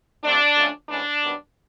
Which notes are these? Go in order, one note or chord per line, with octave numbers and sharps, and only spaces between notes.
C3 F3 A3 C4 D4
F2 D3 F3 A3 C#4
G#2 E3 A3 C#4 D4
F#2 D#3 G3 B3